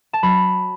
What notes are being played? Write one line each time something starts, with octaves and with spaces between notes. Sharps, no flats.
A5
F#3 B5